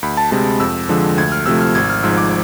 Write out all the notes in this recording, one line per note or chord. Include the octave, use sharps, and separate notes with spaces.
D2 B5
A5
C3 G#3 A5
F2 E6
D3 F3 G#3
D2 G#6
F6
C3 F3 A3 E6
F6
G#1 G#6
F6
G#2 F3 E6
D6